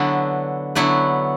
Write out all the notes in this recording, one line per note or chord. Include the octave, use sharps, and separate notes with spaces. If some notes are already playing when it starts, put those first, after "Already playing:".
Already playing: D3 F#3 B3 E4 B4
D3 F#3 B3 E4 B4